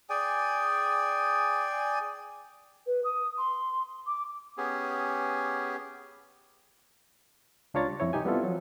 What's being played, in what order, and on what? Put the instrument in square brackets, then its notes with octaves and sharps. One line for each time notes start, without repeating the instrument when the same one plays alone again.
[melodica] G#4 D5 G5 G#5
[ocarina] B4
D#6
C6
D6
[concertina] B3 C#4 G4 G#4
[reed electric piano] C#2 D4 F4 C#5 A#5 A6
G3
F2 E4 C#5
C2 D#4 G4 G#5
G3 B3 C4 E4 F4 A4
F3 F#3